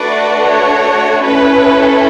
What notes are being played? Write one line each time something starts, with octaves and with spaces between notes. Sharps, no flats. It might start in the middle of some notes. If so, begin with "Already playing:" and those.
Already playing: A3 D4 F#4 B4 D5
C#5
C#4 E4 A4 B4